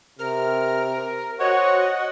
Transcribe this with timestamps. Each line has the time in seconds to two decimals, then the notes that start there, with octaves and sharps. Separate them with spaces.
0.19 C3 A#4 F6
1.39 F#4 C5 C#5 D#5 F#5